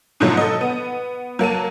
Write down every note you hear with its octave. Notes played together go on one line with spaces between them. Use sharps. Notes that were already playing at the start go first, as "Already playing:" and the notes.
G#2 B2 D3 F3 F#3 A3
A4 D#5
B3
F#3 A#3 A5 D#7